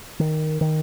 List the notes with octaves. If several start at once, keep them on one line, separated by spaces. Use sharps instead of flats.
D#3
D#3